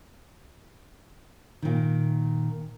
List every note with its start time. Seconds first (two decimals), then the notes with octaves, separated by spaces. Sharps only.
1.62 A#2 D#3